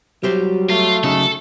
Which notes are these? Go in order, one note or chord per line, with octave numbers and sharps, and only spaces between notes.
F#3 G3 G4 C5
A3 F4
C#3 F#3 D#4 A4